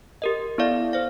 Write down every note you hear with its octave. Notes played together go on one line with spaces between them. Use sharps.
G4 A#4 D#5
B3 E4 A4 D5 F5
C5 F5